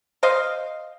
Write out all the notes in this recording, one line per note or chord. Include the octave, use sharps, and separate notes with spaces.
C5 D#5 F5